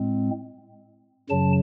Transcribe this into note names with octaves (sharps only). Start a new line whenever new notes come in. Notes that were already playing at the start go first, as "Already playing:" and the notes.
Already playing: A2 G#3 C4
F#2 C#3 F#3 A5